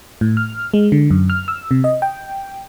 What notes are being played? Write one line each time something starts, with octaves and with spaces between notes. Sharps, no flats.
A2
F6
G#3
D3
F#2
F6
E6
C3
D#5
G5